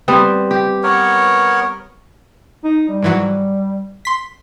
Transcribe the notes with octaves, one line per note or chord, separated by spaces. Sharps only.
G3 B3 C4
G4
B3 A#4 C#5
D#4
G3
G#2 E3 F#3
C6 B6